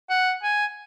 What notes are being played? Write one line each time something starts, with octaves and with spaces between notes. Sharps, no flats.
F#5
G#5